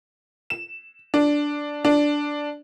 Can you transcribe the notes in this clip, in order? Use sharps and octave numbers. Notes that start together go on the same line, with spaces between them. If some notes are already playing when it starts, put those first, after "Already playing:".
E7
D4
D4